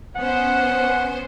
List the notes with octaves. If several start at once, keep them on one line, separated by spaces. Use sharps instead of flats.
B3 C#4 C5 F#5